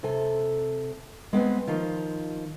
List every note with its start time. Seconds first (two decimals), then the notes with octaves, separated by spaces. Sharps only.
0.03 C3 A4 G#5
1.33 G#3 B3 C4 G#5
1.67 D#3 F3 F4